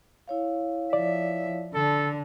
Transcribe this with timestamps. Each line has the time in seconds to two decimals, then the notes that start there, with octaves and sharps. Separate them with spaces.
0.28 E4 C#5 F5
0.93 F3 D5 E5
1.74 D3 A4